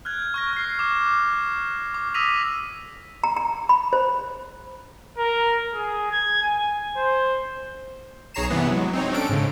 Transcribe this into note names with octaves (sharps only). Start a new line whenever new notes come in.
F6 F#6 G#6
C#6 F6 A#6
F6 C7
D6 E7
D6
D#6 E6 A#6 B6 D#7 F7
A#5
A#5
B5
C5
A#4
G#4
G#6
G#5
C5
B1 G#4 C#5 A#5 C7 E7
G2 C3 E3 B3
F#3 G#3
C4 D#4 C#5
C#4 D4 A4 D7
G#2 C#3